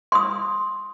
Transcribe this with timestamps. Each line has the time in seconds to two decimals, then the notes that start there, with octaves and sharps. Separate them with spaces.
0.12 C6 D#6